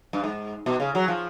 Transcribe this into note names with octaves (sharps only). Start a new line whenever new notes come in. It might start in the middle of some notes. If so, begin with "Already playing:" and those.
G2
G#2
B2
C#3
F#3
F3